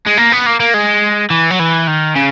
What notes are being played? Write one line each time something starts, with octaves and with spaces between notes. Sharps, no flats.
G#3
A#3
B3
A#3
A#3
G#3
E3
F#3
E3
D#3
C#3